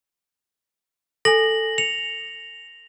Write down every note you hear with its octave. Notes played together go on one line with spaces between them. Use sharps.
A4 G#5 A#6 F#7
C#7 F7